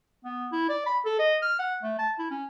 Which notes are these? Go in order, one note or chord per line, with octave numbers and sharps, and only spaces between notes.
B3
E4
D5
B5
A4
D#5
F6
F#5
A3
A5
E4
C#4